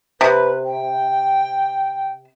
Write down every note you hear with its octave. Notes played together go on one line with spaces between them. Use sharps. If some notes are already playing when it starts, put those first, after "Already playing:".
C3 B4
G5